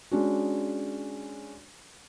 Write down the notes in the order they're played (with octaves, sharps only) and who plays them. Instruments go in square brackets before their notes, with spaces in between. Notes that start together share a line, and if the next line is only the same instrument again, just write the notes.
[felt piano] G#3 C#4 D4 F#4